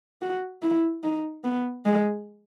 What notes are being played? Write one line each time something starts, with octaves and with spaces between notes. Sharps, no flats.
F#4
E4
D#4
B3
G#3